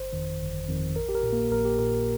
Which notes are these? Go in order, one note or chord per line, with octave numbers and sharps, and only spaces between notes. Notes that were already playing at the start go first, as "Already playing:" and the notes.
Already playing: G1 C5
F2 D#3
G1
F2 D#3
A#1 A#4
G4
A#4
A#2
A#3
A#1 A#4
G4
A#2 A#4